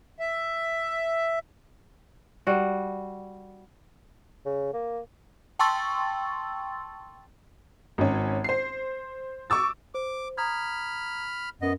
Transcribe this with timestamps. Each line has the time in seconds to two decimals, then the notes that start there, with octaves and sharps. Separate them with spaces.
0.20 E5
2.47 G3 F#4
4.45 C#3
4.73 A#3
5.59 G5 A5 C6 C#6 E6 A6
7.98 G#1 C#4
8.44 C5 C7
9.50 C#6 D6 E6 A6
9.95 C5 D6
10.38 A#5 B5 D#6 F6 G#6
11.62 F#2 B3 D#5